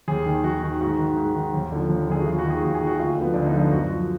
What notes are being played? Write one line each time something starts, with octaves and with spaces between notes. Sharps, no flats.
D#2 G#4
D#3
D#2 F#4
D#3
G#2 F#4
D#3
G#2
D#3
D#2
D3 F3
D#2
D3 F3 G#4
F#4
D#2 F4
F#4
D#3
G#4
D#2 F#4
G#4
D#3
F#4
D2 F4
D3 F3 B3
D2 D4
D#4
D3 F3 F4
F#2 F#4
F3